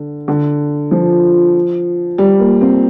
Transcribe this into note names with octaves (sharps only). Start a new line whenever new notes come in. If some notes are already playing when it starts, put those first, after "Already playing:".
Already playing: D3
D3
F3
G3
A#3
C4